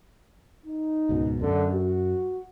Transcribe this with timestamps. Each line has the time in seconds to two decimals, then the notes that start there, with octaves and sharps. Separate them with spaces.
0.65 D#4
1.09 C#2 G#2 B2
1.41 F#2 D3
1.74 F#4